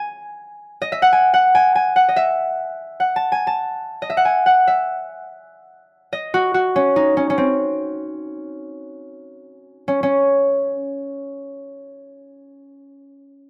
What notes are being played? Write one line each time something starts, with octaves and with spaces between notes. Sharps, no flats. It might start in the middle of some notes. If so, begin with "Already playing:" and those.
Already playing: G#5
D#5
E5
F#5
G#5
F#5
G#5
G#5
F#5
D#5
E5
F#5
A5
G#5
A5
D#5
E5
F#5
G#5
F#5
E5
D#5
F#4
F#4
C#4
D#4
C#4
C#4
C4
C#4
C#4